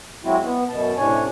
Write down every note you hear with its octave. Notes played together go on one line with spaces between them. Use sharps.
F#3 G#3 C4 E4 F#4
B3
F#2 B2 A5
A2 C3 C#4 D4 C#5 G#5